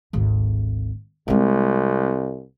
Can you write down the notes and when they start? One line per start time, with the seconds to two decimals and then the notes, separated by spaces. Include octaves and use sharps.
0.13 G#1 D2
1.28 C2 G#3 C4